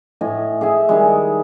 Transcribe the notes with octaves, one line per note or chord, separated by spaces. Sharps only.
A2 D#5 G#5
G#4 E5 G#5
D#3 G3 G#3